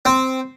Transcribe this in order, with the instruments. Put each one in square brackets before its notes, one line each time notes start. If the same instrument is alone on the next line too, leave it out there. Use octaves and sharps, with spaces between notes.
[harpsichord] C4